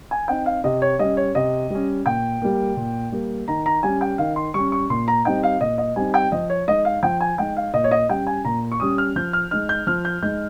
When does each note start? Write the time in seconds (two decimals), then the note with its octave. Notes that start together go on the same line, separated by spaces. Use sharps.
0.11 G#5
0.28 C4 D#4 G5
0.46 F5
0.64 C3 D#5
0.82 C#5
0.99 G3 C#4 D#5
1.17 C#5
1.35 C3 D#5
1.70 G3 C#4
2.06 A#2 G5
2.42 G3 A#3
2.77 A#2
3.12 G3 A#3
3.48 D#3 A#5
3.66 A#5
3.83 G3 C#4 G#5
4.01 G5
4.18 D#3 F5
4.36 C6
4.54 G3 C#4 C#6
4.72 C#6
4.90 A#2 C6
5.08 A#5
5.25 G3 C4 D#4 G5
5.43 F5
5.61 A#2 D#5
5.78 D#5
5.96 G3 C4 D#4 G#5
6.14 G5
6.32 F3 D#5
6.50 C#5
6.68 G#3 D#4 D#5
6.85 F5
7.03 F3 G5
7.21 G#5
7.38 G#3 D#4 G5
7.57 F5
7.74 A#2 D#5
7.84 C#5
7.91 D#5
8.09 G3 C#4 G5
8.27 G#5
8.45 A#2 A#5
8.72 C#6
8.80 G3 C#4 D#6
8.98 F6
9.16 F3 G6
9.33 F6
9.51 G#3 D#4 F6
9.69 G6
9.87 F3 F6
10.05 G6
10.23 G#3 D#4 G6